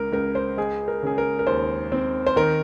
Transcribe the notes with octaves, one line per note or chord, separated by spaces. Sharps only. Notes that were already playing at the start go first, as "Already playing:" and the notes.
Already playing: C#2 A#4
C#2 A#4
C5
G#3 G#4
A#4
C#3 G#4
A#4
A#4
D#2 C5
C4
C5
D#3 A#4